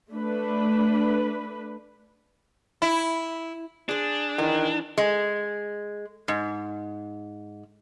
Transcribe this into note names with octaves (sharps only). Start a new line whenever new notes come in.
A3 D4 B4
E4
D4 G#4 C5
D#3 E3 G#5
G#3
G#2